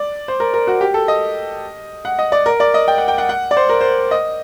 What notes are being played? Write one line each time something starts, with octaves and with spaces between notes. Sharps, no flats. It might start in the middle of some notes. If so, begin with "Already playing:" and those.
Already playing: D5
C5
A#4
A#4
F#4
G4
A4
D#5
F#5
D#5
D5
A#4
D5
D#5
G5
F#5
G5
F#5
F#5
D5
C5
A#4
C5
D#5